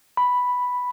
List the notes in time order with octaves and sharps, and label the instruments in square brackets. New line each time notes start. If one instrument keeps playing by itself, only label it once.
[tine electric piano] B5